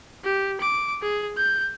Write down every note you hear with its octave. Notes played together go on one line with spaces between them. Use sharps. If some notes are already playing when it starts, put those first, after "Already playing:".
G4
D6
G#4
G6